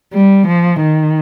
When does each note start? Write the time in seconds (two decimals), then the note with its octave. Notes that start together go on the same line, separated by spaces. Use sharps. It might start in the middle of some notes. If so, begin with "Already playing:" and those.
0.14 G3
0.47 F3
0.81 D#3